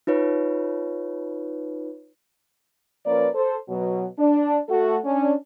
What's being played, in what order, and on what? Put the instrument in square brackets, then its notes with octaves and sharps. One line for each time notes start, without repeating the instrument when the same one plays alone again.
[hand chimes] D#4 F4 B4 C#5
[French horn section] F3 A#3 C#4 A#4 B4 D5
A4 C5
B2 F#3
D4
A3 F#4 A4
C#4 D4